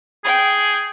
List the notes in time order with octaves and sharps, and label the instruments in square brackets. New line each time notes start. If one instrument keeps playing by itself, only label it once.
[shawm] G#4 [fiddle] G5